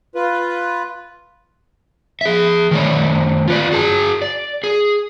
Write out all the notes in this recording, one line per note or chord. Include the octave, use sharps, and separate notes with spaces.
F4 B4
G#4 E5
D#3 A3 A4 C#5 D5
F4 B4 D5
F#4 G#4 A5
D5
G#4